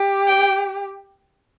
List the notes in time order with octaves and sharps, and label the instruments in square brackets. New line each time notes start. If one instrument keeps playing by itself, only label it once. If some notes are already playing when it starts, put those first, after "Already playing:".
Already playing: [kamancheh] G4
[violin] G5